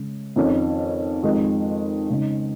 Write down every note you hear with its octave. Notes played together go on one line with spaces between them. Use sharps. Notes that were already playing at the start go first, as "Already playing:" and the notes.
Already playing: C#3 G#3
F2 D#3 C#4
F2 D#3 G#3
C#3 G#3 D#4